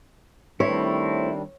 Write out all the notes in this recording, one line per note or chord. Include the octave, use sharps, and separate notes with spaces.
D#3 G3 A3 C4 D4 E4 C#5